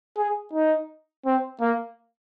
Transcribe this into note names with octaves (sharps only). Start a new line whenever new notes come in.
G#4
D#4
C4
A#3